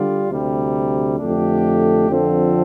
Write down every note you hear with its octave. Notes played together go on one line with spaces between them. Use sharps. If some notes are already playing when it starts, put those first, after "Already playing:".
Already playing: D3 G3 F4 D5
D2 C3 G3
F2 D3 A3 D4 G4
F2 D3 F3 C4 A4